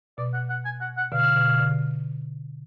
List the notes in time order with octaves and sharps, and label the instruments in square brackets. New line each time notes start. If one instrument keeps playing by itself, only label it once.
[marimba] B2 [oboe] D5
[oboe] F#5
F#5
G#5
F#5
F#5
[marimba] B2 D3 [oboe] F5
[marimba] B2 D3
B2 D3
B2 D3